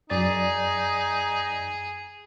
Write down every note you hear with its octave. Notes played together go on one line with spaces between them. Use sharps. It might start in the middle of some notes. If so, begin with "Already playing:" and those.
F#2 D#4 G#4 D5 A6